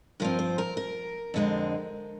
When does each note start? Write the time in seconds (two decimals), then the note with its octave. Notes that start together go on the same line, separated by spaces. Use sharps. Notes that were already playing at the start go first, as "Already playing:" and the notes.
0.20 G2 F3 C4 A#4
0.39 C5
0.58 A#4
0.77 A#4
1.34 F2 D3 G#3 C4